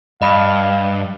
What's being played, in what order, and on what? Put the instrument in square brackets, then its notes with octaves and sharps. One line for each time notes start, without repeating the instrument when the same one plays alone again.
[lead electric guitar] G2 [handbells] D#5 B5 [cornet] F5